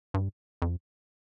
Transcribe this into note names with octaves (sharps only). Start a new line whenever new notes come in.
G2
F2